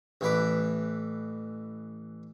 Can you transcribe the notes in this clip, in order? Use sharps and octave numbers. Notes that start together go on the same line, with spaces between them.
A1 E3 B4 D6